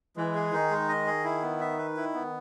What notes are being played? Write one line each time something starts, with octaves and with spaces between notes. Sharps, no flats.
E3 G#3
G#4
D#3 D#4
G#3
D#5
G#4
E4
B3
E5
B4
E4
B3